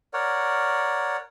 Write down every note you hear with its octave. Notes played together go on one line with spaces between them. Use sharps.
A#4 C#5 D5 F#5